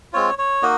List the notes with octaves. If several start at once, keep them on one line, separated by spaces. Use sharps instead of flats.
G#3 C4 F4 C#5
C#5
A#3 D#4 F#4 D#5